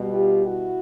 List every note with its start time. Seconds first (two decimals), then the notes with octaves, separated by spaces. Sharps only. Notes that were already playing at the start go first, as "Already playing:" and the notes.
Already playing: B2 G3
0.11 F4 G4
0.43 E4 F#4